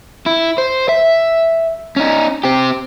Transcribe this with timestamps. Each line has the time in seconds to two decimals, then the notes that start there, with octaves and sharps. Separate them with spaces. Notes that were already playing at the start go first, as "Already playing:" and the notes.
0.26 E4
0.58 C5
0.89 E5
1.96 C#4 D#4
2.43 C4 G4